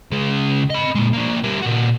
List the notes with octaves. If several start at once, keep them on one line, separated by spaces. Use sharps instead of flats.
C#3 G#3
D#5 B5
A#2 G#3
A#3 D4
G3 A#4
A#2 F#4